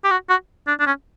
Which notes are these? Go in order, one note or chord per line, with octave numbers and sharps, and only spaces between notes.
G4
F#4
F#4
D4
D4
C#4